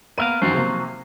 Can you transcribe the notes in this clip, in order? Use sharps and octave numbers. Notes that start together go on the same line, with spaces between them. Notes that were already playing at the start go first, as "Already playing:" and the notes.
A#3 B3 A#4 E5 F5 D#7
F#2 D#3 F3 F#3 C5
C3 A#3